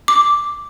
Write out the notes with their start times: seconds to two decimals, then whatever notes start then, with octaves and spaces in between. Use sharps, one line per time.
0.08 D6